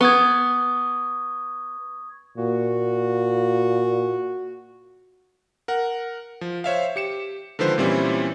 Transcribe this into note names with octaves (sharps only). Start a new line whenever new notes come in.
B3 C#6 D#6 G#6
A#2 F#4
A#4 F#5
F3
C5 C#5 E5 F5
G4 C#7 E7
D3 D#3 F3 G#3 B4 C5
A#2 E3 G3 C4 C#4 E4